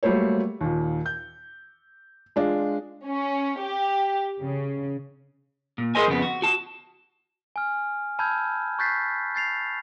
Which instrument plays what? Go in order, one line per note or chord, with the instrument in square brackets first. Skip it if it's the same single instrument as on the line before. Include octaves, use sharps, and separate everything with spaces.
[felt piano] F#3 G3 A3 A#3 C5 C#5
D#2 A#2
G6
G#3 D4 F4
[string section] C#4
G4
C#3
[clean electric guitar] A#2
G#4 A#4 C5 D#5 G#5
F2 C#3 B3
F#4
F#4 A5
[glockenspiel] G#5 F6
A5 B5 E6 F6 G6 G#6
C#6 F#6 G6 A6 B6 C7
G6 A6 C7 F7